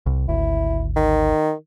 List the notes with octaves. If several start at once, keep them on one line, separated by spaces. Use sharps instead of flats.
C2
G#1 D2 E4
D#3